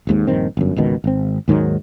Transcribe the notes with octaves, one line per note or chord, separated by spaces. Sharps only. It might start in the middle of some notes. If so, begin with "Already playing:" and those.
G#1 D#2 G#2
A#1 G2 D#3 C4
G1 F#2
G#1 C#2 B2 D#3
G#1 C4
D#2 G#2 D#3 F#3